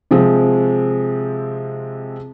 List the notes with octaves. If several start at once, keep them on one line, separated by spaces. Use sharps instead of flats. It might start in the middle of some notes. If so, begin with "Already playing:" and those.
C3 F3 G#3 C4